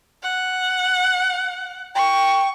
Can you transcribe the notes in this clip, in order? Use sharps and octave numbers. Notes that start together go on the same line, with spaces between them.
F#5
G5 C#6